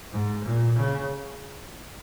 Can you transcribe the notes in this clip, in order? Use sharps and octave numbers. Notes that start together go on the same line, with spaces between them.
G#2
A#2
C#3